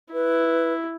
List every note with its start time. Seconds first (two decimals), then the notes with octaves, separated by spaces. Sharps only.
0.13 E4 B4